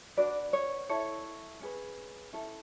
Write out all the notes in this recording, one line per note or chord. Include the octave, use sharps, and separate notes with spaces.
D4 F#4 B4 D5
C#5
E4 A4 C#5
C#4 G#4 B4
C#4 E4 A4